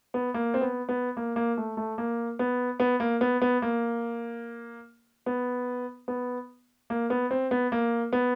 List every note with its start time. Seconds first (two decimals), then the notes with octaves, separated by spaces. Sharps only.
0.14 B3
0.34 A#3
0.54 C4
0.61 B3
0.89 B3
1.17 A#3
1.36 A#3
1.57 A3
1.77 A3
1.98 A#3
2.39 B3
2.80 B3
3.00 A#3
3.21 B3
3.42 B3
3.62 A#3
5.26 B3
6.08 B3
6.90 A#3
7.10 B3
7.31 C4
7.51 B3
7.72 A#3
8.13 B3